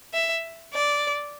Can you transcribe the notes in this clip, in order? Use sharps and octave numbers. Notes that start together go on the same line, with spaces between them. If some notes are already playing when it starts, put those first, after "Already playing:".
E5
D5